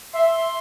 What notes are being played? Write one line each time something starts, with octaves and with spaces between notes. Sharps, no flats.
E5 C6